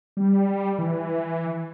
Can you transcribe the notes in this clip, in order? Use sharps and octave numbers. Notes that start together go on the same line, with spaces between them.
G3
E3